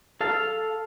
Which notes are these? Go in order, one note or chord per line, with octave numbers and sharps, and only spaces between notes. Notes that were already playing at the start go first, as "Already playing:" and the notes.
A4 F5 A5